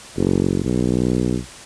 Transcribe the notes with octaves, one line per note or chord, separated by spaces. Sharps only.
F#1
B1